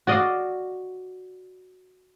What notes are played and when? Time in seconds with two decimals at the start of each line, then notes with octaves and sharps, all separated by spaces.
0.07 F#4 D5 D#5 F5